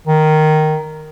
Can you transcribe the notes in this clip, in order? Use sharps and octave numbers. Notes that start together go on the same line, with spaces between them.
D#3